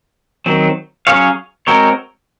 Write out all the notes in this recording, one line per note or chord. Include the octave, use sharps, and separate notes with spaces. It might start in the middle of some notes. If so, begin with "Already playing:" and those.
D#3 F#3 C4
F#3 C#4 G#4 C#5 F5
G#3 C4 F#4 A#4 C#5